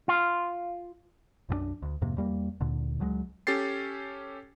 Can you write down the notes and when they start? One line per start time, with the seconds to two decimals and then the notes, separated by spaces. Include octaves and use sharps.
0.08 F4
1.49 B1 F#2 F#3 D4
1.82 D2
2.01 F2 G#2 C3 A#3
2.17 E2 G3 A#3
2.60 D2 A#2 D3
3.00 C#2 F#3 G#3
3.47 C#4 G4 A4 A6 C7